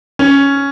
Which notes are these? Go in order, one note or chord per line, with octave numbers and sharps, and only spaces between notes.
C#4